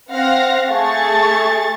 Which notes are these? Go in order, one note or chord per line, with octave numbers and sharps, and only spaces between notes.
C4 F5 F#5 A#6
A3 G#4 C#6 A6